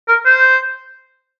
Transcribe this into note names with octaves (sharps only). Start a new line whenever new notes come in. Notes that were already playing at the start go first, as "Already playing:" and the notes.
A#4
C5